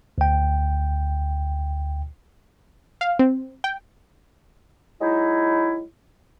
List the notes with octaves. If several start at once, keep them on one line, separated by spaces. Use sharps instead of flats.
D2 G5
F5
C4
G5
F#3 G#3 D#4 E4